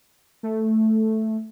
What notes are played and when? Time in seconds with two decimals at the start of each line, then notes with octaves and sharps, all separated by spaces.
0.43 A3